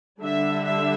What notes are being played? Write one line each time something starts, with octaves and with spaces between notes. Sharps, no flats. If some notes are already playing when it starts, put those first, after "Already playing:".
D3 G3 D4 E5
E5